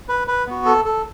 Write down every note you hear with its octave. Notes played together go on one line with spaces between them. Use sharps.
B4
B4
B3 F#4
A4
A4